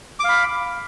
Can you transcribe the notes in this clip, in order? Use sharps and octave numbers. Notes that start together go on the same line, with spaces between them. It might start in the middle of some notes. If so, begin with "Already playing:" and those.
F5 B5 D6